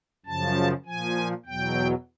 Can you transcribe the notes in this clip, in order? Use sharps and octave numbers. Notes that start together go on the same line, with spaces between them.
F#2 C#3 F3 A5
A#2 F3 G#5
E2 B2 F#3 G5